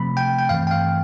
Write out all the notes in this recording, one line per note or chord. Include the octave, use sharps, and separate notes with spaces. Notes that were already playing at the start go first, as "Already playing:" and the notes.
Already playing: C3 F3 A3 C4 B5
G5
G5
G2 E3 A3 C4 F5
G5
F5